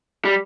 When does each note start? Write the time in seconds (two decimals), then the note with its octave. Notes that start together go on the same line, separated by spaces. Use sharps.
0.25 G3